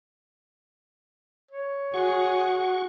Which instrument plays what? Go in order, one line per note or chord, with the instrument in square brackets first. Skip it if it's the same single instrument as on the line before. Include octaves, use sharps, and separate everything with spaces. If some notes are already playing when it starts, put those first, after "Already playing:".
[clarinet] C#5
[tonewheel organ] F#4 C#6 [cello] G#4 [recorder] F#5